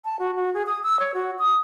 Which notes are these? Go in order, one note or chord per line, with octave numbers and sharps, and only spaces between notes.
A5
F#4
F#4
G#4
D#6
E6
C#5
F#4
D#6